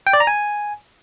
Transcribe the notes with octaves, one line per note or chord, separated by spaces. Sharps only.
G5
D5
A#5
G#5